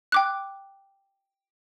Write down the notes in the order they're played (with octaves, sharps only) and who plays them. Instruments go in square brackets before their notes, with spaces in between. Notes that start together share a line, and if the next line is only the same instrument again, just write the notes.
[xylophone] G5 D6 F#6